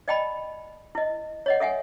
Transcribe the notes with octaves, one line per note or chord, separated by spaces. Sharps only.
D5 D#5 G5 A5 B5
E4 D#5
C#5 D#5 F#5
A4 E5 F#5 G#5